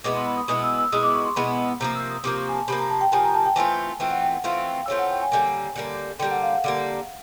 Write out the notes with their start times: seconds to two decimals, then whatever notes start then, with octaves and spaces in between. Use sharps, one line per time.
0.04 B2 G#3 B3 E4 D6
0.15 C6
0.26 B5
0.37 D#6
0.48 B2 G#3 B3 E4 D#6
0.63 E6
0.78 E6
0.92 B2 G#3 B3 E4 D#6
1.03 D6
1.14 C#6
1.25 C6
1.36 B2 G#3 B3 E4 B5
1.80 C3 F3 A#3 A#5
1.95 E6
2.10 D#6
2.24 C3 F3 A#3 D6
2.38 C#6
2.48 G#5
2.54 A5
2.68 C3 F3 A#3 B5
2.79 A#5
2.90 A5
3.01 G5
3.12 C3 F3 A#3 G#5
3.24 A#5
3.35 A5
3.46 G5
3.56 E3 A3 C4 F4 G#5
4.00 E3 A3 C4 F4 G5
4.11 F#5
4.22 G5
4.33 F#5
4.44 E3 A3 C4 F4 F5
4.88 E3 A3 C4 F4 C#5
4.99 F#5
5.10 G5
5.21 G#5
5.32 D3 G3 A#3 G#5
5.76 D3 G3 A#3
6.19 D3 G3 A#3 G5
6.31 F#5
6.42 F5
6.53 F#5
6.64 D3 G3 A#3 F#5